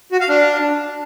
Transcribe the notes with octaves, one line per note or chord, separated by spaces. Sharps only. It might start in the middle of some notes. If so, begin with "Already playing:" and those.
F#4
F5
D4